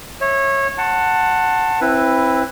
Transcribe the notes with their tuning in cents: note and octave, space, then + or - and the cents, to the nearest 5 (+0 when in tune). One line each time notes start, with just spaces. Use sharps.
C#5 -20 E5 -10
F#5 +0 A5 +15 C6 +40
C4 +25 E4 +0 B4 +0